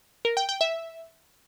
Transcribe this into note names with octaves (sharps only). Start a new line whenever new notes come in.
A#4
G5
G5
E5